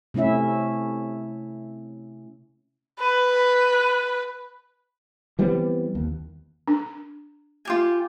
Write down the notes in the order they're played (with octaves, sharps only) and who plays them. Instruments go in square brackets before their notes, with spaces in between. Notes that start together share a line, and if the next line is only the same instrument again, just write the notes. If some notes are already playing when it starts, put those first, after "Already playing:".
[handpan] C3 A3 C#4 E4 E5
[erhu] B4
[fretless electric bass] E3 G3 B3 C4
D#2
[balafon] D4
[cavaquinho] F4 G4 G#5